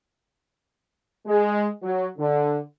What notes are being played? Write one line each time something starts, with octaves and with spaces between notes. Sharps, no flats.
G#3
F#3
D3